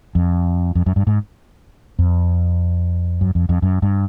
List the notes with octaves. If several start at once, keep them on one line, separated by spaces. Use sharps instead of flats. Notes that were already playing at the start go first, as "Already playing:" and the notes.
F2
F2
F#2
G2
G#2
F2
F#2
F2
F2
F#2
G2